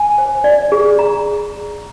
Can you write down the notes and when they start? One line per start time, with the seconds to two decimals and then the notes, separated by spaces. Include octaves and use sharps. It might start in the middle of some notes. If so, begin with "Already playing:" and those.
Already playing: G#5
0.18 C5
0.44 D5
0.72 G#4
0.99 A#5